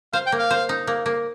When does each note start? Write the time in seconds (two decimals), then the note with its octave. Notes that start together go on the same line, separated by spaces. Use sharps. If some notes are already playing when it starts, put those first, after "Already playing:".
0.13 C5 F5
0.26 G5
0.32 A#3
0.39 F5
0.51 C5
0.69 D#4
0.87 A#3
1.06 A#3